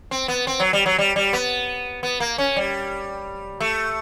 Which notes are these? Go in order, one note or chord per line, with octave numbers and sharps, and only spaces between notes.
C4
B3
C4
F#3
G3
F#3
G3
G3
B3
B3
A#3
C#4
G3
A3